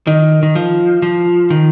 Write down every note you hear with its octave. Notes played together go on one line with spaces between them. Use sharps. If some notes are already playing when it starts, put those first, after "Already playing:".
D#3
D#3
F3
F3
D#3